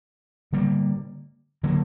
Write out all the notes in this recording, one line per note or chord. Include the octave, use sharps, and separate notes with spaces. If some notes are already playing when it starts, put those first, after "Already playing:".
D3 G3 A#3
D3 F#3 A#3